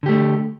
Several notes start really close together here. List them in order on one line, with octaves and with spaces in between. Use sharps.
D3 G4 A3